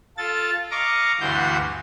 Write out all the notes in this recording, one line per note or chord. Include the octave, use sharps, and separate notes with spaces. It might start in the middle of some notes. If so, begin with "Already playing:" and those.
F4 A4 A6
D#5 F5 A#5 C#6 D6
D2 G2 E3 F#4 C6 G6